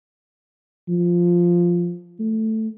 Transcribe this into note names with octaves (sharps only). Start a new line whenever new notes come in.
F3
A3